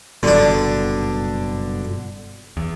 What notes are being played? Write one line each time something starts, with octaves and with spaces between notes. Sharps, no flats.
F#1 G2 B2 D3 D4
E2